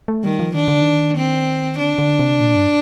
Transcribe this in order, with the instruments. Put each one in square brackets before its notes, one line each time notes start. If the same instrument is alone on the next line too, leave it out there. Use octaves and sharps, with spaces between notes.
[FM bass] A3
[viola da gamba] D#3 [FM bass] G3
[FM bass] F3
[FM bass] D#3 [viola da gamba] D4
[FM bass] D3
D#3
[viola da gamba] C4
[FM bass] D3 [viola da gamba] D4
[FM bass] D3
C3
A#2
G2